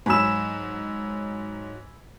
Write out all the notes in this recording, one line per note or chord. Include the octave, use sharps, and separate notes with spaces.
G#2 F#3 G#5 B5 E6 E7